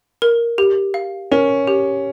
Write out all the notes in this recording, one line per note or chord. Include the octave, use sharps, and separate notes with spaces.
A#4
G4
F5
C#4 A#4
G4